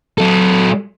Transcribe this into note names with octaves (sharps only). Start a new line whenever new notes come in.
F#3 A4